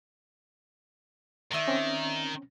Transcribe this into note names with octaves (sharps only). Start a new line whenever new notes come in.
D#3 D5 E5
C4 C#4